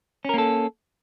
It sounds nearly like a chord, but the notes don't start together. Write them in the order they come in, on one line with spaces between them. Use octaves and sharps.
C#4 A#4 A#3 A4